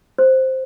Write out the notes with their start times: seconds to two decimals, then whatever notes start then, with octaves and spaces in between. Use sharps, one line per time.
0.19 C5